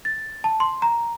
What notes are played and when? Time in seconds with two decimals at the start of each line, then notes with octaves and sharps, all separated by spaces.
0.05 A6
0.44 A5
0.60 C6
0.82 A#5